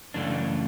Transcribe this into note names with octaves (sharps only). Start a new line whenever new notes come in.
F#2 C#3 E3 A3 D4